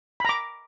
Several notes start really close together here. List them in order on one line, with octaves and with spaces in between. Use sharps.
B5 A#5 D6